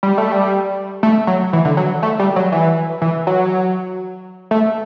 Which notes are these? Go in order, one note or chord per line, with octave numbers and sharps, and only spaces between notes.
G3
A3
G3
A3
F#3
E3
D3
F#3
A3
G3
F#3
E3
E3
F#3
A3